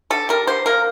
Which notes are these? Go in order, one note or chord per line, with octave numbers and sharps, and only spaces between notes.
D3 A4
G3 A#4
D3 C5
A#3 A#4